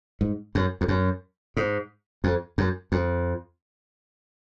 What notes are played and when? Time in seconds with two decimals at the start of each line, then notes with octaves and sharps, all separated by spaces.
0.21 G#2
0.55 F#2
0.81 F2
0.88 F#2
1.57 G#2
2.24 F2
2.58 F#2
2.92 F2